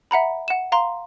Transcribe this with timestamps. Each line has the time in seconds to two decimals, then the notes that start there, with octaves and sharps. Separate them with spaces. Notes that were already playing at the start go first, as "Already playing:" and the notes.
0.11 E5 F#5 A#5 B5
0.48 F#5 E7
0.72 F5 A#5 C6